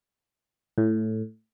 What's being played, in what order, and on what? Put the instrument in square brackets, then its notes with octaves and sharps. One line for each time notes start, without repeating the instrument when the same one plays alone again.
[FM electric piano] A2